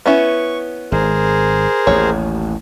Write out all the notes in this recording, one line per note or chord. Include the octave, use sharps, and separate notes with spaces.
B3 C#4 E4 C#6
G#1 G#4 A#4 C5
A1 D#2 C#5